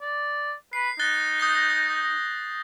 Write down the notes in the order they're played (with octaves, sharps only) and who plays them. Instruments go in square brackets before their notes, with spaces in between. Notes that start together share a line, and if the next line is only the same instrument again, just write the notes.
[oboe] D5
[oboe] B4 [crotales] C7
[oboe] D#4 [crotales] F#6 A6 G7
[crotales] D#6 G6 A#6